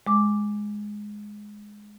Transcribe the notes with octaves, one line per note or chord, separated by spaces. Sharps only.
G#3 D6